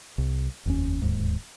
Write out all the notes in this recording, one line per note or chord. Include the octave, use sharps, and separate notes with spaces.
C2
F1 D#2 C#4
D1 D#2 G#2